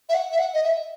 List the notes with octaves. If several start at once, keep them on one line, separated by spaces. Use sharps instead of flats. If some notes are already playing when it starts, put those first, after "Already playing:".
E5
F#5
E5
F#5
D#5
E5